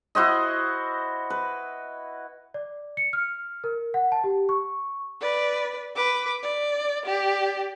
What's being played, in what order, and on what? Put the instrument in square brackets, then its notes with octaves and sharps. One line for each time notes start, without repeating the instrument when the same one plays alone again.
[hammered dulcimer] E4 F#4 C5 D#5
B4
[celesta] D5
C#7
F6
A#4
F#5
A5
G4
C#6
[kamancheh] B4 D5
B4 D6
D5
G4 D5